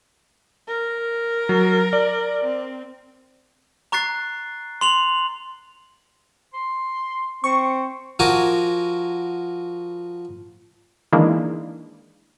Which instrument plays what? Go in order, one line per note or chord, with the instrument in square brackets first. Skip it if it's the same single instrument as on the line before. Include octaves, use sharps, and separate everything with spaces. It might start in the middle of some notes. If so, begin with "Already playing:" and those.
[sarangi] A#4
[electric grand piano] F#3
D5
[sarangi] C4
[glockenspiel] A#5 C#6 F#6 A6 C7
C6 F7 F#7
[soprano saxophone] C6
[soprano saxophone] C4 [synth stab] C#6
[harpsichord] F3 F#4 A#4 G#5 D6
[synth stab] D#3 E3 G#3 A#3 D4